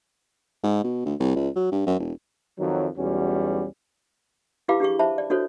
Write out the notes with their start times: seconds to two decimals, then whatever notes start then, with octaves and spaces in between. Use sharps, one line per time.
0.63 G#2
0.84 B2
1.05 D2
1.20 C2
1.36 C#2
1.56 F#3
1.72 G2
1.87 F#2
1.99 E1
2.59 F2 D#3 F#3
2.98 B1 E2 G3 C#4 F#4
4.68 E4 G4 B4 F5 B5 D6
4.80 D4 G4 G#4 C#6
4.99 C5 E5 A5 B5
5.18 D5
5.30 D4 F#4 A4 C5 C#5